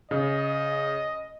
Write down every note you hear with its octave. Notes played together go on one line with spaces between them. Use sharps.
C#3 D#5